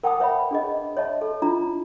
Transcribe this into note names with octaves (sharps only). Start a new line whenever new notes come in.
A#4 F#5 G5 A5 D6 D#6
B4 C#5 E5 G5 B5
D4 G#4 D#5
C#5 D#5 E5 A5
A4
D4 E4 F4 A#5